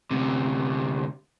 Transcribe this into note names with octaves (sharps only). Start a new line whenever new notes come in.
D2 C3